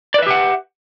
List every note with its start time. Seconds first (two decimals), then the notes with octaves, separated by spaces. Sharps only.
0.14 D5
0.18 B4
0.22 E5
0.26 G4
0.31 F#5